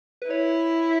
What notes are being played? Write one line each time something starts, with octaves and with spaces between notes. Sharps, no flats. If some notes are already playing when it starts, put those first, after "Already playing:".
B4
E4 C#5